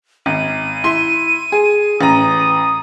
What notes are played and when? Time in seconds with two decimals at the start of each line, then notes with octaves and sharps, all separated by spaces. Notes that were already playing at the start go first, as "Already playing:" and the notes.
0.26 G#1 D#7
0.84 E4 C6
1.52 G#4
2.01 A1 A#5 D#6